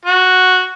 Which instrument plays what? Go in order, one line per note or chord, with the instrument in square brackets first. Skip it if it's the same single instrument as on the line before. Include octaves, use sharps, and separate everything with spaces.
[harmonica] F#4